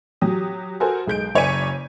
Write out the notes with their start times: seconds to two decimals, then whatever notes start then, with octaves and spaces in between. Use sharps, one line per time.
0.21 F#3 G4 D#6
0.80 F#4 A4 A#4 C5 G#5
1.07 B1 G#3 G6 D7
1.35 F#1 C#5 D5 G#5 B6 D#7